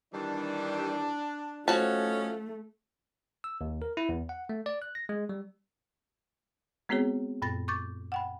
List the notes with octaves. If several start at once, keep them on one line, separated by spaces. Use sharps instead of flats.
D#3 E3 G3 D4
F3 A3 C#4 D#4 F#4 C#5 A5
E6
D#2
A#4
E4
E2
F#5
A3
D5
F#6
A#6
G#3
G3
G#3 B3 C4 F#4 G#4 C#5
F#2 A#2 B5 A6 A#6
C#6 D6 G6 A6
F#5 G5 B5